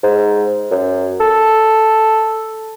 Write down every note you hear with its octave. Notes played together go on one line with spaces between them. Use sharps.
G#2
F#2
A4